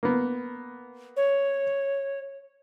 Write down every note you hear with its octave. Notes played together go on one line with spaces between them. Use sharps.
A#3 B3
C#5